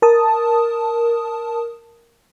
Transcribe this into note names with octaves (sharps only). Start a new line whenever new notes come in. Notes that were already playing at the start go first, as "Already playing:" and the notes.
A#4 A5 D#6